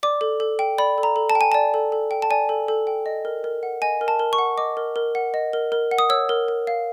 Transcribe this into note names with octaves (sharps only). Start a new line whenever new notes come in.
D5 D6
A4
A4
G5
D5 B5
A4
A#5
A4
A5
G5
G#5
D5 A5
A4
A4
G5
A5
D5 G#5
A4
A4
G5
D#5
A#4
A#4
F#5
D#5 G#5
A#4
A5
A#4
C#6
F#5
D#5 D6
A#4
A#4
F#5
D#5
A#4
A#4
F#5
D#6
C#5 E6
A#4
A#4
F5